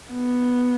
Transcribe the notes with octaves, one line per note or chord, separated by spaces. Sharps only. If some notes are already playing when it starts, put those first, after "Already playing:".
B3